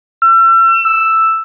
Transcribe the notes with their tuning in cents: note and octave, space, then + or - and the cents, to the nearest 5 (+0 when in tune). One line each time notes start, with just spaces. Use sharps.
E6 +35
E6 +5